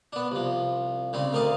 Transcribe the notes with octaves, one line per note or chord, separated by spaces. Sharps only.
B3 D4
C2 F3
C#3 G3 C4
D2 A#4 D5 D#5 F5